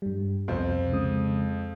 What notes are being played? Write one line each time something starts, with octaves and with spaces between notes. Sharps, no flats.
G2 G3
C2 F2 B2 C5
C#3 G#3 D#6